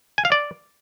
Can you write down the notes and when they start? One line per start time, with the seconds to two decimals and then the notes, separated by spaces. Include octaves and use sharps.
0.18 G#5
0.25 F5
0.32 D5